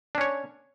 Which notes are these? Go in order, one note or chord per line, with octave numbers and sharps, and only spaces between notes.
C#4 D4 C#5